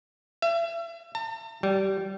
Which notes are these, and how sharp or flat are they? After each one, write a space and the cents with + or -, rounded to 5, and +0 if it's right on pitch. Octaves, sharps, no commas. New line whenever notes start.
E5 +35
A5 +45
G3 -20